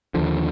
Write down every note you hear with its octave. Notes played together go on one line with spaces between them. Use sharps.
D#2 D3 F3